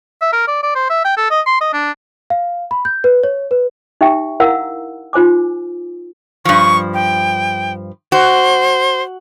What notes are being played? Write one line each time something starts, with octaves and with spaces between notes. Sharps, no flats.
E5
A#4
D5
D5
C5
E5
G5
A4
D#5
C6
D#5
D4
F5
B5
G6
B4
C#5
B4
D#4 G4 E5 G5 C#6
E4 A#4 F5 F#5 A#5 E6
D#4 F4 C5 G#5 D6
G2 F3 C#6
G5
F#4 C5